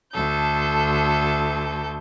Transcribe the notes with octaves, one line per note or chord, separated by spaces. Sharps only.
D2 A4 G6